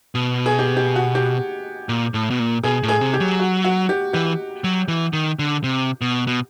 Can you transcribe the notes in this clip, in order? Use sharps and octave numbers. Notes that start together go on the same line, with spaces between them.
B2
G#4
G4
G4
F#4
G4
A#2
A2
B2
A#2
B2 G#4
A2
G#4
C3
G4
F#3
F#4
F#4
G4
E3 G4
F#3
E3
D#3
D3
C3
B2
B2